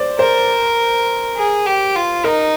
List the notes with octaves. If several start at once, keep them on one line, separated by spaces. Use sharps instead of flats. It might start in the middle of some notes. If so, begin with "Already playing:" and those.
Already playing: C5 D5
A#4 C5
G#4
G4
F4
D#4 A#4